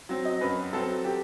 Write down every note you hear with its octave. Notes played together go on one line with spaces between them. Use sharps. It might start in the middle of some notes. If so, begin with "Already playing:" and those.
F#3 C4
D#5
F#2 B4
F#3 C4 A4
G4